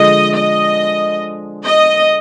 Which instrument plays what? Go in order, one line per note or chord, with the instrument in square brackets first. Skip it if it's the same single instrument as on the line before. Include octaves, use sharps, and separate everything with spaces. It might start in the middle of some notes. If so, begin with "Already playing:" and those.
Already playing: [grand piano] D3 F3 G#3 [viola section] D#5
[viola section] D#5
D#5